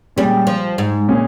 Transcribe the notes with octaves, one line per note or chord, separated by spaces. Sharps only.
A#2 G3 G#3 C#4 G#4
F3
G#2
A#2 G#3 C#4 G#4